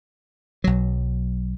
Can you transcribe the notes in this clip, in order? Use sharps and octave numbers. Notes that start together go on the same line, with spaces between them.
B1 F#3